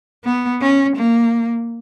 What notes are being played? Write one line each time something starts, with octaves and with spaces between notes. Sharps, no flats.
B3
C#4
A#3